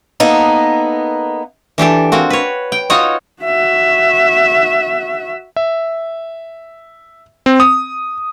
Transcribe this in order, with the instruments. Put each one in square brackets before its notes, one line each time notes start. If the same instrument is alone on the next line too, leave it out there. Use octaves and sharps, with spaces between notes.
[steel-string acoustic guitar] A#3 B3 D#4 A4
[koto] E3 D4 G4 A4
A#3 C4 F#4
B4 C#5
G5
D#4 F4 F#4 C#5 D#5
[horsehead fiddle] F#4 E5
[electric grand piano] E5
C4
D#6